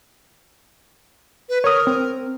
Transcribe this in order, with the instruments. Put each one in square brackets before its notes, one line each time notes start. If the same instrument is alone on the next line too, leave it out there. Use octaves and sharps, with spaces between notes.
[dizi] B4
[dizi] A#4 [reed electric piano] C#5 D#6
[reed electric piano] C4